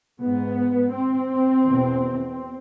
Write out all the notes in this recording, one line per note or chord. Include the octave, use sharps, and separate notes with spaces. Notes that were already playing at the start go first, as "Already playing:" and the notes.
G#2 B3
C4
E2 B2